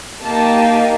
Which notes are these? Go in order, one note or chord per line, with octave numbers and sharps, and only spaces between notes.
A#3 D#4 G4 A5